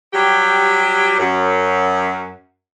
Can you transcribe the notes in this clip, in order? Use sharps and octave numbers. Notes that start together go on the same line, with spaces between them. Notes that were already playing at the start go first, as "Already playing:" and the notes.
F#3 G3 G4
F#2